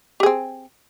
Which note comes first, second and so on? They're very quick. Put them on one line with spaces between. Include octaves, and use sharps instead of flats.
G4 G#4 C4